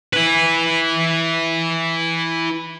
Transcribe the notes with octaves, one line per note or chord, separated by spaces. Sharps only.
E4 B4